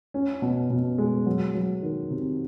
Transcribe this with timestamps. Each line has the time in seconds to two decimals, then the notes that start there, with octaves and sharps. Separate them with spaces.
0.14 C#4
0.42 B2
0.70 B2
0.98 G#3
1.26 F#3
1.55 F#3
1.82 D#3
2.10 C3